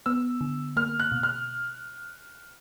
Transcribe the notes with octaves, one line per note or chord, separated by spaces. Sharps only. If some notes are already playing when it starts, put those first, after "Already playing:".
B3 E6
D3
A#3 F6
F#6
B2
F6